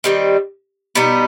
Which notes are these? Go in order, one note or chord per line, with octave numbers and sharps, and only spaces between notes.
D#3 G3 C4
B2 G3 B3 D#4